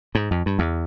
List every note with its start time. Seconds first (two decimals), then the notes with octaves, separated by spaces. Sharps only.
0.15 G#2
0.31 F2
0.46 G2
0.59 E2